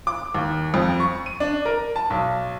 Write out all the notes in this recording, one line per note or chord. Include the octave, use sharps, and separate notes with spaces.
D6
D#2
F2
C#6
D#7
D4
A#4
A5
B1